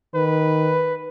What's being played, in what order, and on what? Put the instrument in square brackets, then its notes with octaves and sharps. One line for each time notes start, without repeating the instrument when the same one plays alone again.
[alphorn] D#3 [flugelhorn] B4